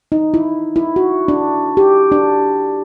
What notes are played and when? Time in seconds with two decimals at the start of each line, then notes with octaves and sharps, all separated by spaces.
0.12 D#4
0.34 E4
0.76 E4
0.96 F#4
1.28 D4
1.77 G4
2.12 D4